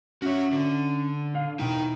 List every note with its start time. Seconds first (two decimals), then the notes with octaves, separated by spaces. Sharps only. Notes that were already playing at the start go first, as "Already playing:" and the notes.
0.22 C#4 F#4 C#5 E5
0.53 D3
1.34 D4 F5
1.59 B2 D#4 E4 G5